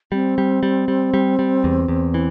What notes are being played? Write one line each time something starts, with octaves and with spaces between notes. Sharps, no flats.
G3 C4
G3
G3
G3
G3
G3
E2
E2
E3